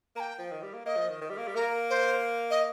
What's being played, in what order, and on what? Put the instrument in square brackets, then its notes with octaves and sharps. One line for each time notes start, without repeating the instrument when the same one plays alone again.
[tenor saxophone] A#3 [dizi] A#5
[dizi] G5
[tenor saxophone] F3
D#3
G3
A#3
[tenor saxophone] A#3 [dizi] D#5
[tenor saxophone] F3
D#3
D#3
G3
A#3
G3
[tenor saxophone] A#3 [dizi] A#4
[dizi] C5
D#5